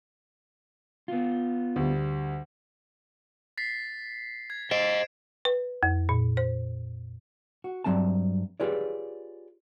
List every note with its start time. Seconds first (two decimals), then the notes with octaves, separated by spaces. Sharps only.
1.08 B3 F4
1.76 D2 G3
3.58 A6 B6 C7
4.50 G#6
4.71 C5 D#5 C7 D7 E7
5.45 B4
5.83 F2
6.09 A#2
6.37 C5
7.64 F#4
7.84 G2 F#3 C4 E5 A5
8.60 F4 G4 G#4 B4 C#5 D5